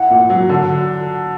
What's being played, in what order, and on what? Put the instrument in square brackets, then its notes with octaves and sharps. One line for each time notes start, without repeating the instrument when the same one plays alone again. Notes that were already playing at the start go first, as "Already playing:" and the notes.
Already playing: [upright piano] E2 E4 [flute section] F#5
[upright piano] A#2
F#3
D3